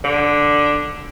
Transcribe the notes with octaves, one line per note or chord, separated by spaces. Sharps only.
D3